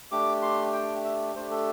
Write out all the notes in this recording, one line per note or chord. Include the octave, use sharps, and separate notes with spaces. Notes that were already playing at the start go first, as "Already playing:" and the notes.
A3 D4 G4 D6
C6
G5
E5
A3 D4 G4 C5
A4